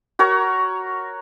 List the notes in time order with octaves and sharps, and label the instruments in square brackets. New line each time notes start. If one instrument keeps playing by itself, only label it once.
[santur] F#4 A#4 C#5 A#5